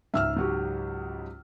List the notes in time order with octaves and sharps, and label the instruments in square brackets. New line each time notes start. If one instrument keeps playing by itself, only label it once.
[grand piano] C#2 G#2 [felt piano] E5 E6 F6
[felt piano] F#3 F#4 G4